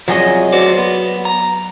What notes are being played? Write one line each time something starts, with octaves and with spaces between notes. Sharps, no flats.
C2 F3 F#3 G#4 D#5
F#4 C5 D5
B3
A#5